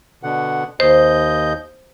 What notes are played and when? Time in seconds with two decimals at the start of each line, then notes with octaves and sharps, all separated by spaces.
0.23 B2 D3 F#5
0.80 D#2 C5 D#5 G6